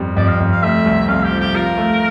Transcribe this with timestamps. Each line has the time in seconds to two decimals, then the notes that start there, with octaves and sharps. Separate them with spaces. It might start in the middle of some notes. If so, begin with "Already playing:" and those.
Already playing: F2 G3
0.16 F2 D5
0.28 F5
0.40 F2
0.51 F5
0.62 A3 E5
0.86 C2
1.08 C2 F5
1.24 G4
1.31 F3
1.40 G4
1.55 F4 A#4
1.77 A3